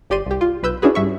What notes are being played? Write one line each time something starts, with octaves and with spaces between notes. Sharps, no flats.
G1 G4 D5 C6 D#7
C2 G4
F4
B1 B4 E6 G6
C#4 D4 E4 F#4 G#4 B4
G2 E5 C#6